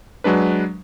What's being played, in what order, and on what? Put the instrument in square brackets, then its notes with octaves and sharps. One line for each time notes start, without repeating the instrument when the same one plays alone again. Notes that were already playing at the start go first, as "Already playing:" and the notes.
[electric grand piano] F#3 G#3 D4 B4